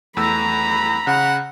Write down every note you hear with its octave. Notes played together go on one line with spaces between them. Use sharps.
E2 A3 A#5 B5 E6
C#3 F#5